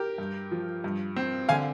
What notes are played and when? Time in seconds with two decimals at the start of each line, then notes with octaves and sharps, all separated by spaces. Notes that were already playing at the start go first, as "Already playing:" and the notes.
Already playing: G4 A#4
0.18 G2
0.51 F3
0.84 G2
1.17 C4
1.49 D3 F5 G#5